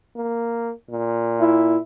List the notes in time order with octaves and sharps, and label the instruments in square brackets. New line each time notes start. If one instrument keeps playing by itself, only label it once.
[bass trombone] A#3
A#2
[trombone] E4